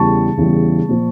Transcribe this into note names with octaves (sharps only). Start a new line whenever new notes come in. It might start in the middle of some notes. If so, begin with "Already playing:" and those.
Already playing: E2 C#3 E3 G3 A5 C#6
E2 C#3 E3 G3
A#2 F3